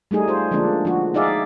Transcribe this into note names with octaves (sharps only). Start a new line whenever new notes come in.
G3 A3 D#4 G#4
F4 C5
D3 F3 G#3 A#3 D4
F3 D4 F#4
D#4 G#4 D5 E5 F5